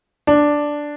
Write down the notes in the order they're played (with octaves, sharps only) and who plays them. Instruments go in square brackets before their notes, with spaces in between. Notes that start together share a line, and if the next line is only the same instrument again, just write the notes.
[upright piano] D4